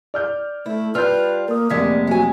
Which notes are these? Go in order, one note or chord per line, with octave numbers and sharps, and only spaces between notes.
D5 F6 G6
A3 E4
G3 D4 F4 B4 F6 G6
A#3 A#4 D#6
F1 D3 G#3 A#3 D5 G#6 B6
F#3 G#3 G#5